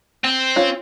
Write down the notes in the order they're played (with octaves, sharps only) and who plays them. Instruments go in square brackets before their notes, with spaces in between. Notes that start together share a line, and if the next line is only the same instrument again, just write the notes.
[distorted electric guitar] C4
[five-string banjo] C#4 F4